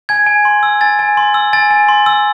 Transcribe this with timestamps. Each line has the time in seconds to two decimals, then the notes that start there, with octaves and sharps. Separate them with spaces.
0.09 G#5 G#6
0.27 G#5
0.45 C6
0.63 E6
0.81 G#5 A6
0.99 G#5
1.17 C6
1.34 E6
1.53 G#5 A6
1.71 G#5
1.89 C6
2.06 E6